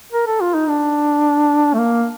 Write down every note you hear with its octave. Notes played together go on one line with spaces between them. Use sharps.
A#4
A4
F4
D#4
D4
A3
A#3